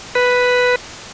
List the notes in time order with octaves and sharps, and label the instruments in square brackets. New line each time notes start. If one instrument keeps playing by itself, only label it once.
[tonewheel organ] B4